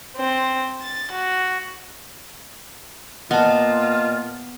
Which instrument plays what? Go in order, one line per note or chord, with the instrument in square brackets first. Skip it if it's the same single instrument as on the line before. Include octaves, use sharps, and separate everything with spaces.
[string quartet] C4
A6
F#4
[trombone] A#2 [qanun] B3 [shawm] F4 [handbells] D#5 A5